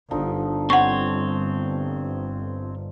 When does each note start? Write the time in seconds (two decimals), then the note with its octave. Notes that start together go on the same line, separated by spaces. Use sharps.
0.11 G1 D3 F3 D#4
0.70 C4 C#5 F#5 C#6